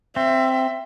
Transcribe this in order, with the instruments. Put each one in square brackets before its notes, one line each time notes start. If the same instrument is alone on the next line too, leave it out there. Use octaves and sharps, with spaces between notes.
[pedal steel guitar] C4 [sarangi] E5